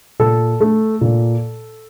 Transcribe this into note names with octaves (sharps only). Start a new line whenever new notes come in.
A#2 A4
A3
A#2